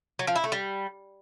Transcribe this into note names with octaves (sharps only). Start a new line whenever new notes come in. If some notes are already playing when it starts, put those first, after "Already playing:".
F#3
F3
E4
A3
G3